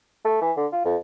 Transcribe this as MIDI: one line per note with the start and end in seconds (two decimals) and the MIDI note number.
0.25 0.41 57
0.41 0.52 52
0.57 0.67 50
0.72 0.81 65
0.84 0.96 41